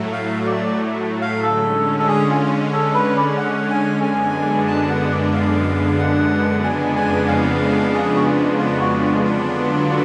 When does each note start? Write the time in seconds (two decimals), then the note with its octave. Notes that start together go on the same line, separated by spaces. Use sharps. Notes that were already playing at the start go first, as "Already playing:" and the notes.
Already playing: A2 F#3 A3
0.13 F5
0.46 D5
1.22 F5
1.43 D3 G#3 C#4 A4
1.99 A4
2.08 G#4
2.30 F4
2.73 A4
2.94 B4
3.16 D5
3.38 F#5
3.70 G#5
4.03 F#2 D3 G#3 B3 D4 G#5
4.68 A5
4.91 F#5
5.12 D5
5.33 F5
5.99 F#5
6.63 F2 C#3 G#3 B3 D4 G#5
6.96 G#5
7.28 F5
7.94 G#4
8.16 F#4
8.26 F4
8.58 F4
8.80 F#4
9.02 F4
9.23 D3 F#3 B3 D4 F4
9.89 F4